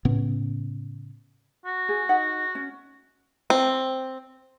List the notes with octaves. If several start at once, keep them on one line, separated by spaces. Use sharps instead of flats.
A2 C#3 B3 C#4
F#4
G#4
D#4 F#5
C#4
C4